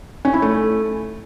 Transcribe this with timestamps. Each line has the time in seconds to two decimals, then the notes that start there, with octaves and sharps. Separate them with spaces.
0.25 C#4
0.33 E4
0.42 A3